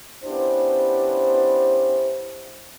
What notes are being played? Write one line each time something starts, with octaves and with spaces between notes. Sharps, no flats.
B3 C#4 D4 E4 G4 C5